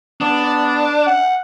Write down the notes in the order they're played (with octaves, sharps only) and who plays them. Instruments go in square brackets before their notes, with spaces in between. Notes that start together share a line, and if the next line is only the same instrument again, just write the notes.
[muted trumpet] B3 [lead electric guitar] D4
[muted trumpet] F#5